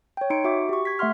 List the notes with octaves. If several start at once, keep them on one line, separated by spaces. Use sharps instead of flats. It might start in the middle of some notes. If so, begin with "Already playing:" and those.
C#5 G5
D#4 C6 C#7 D7
F#4 E5 D6
G4 C#6
G#6 B6
A3 E5 F#5 C6 F6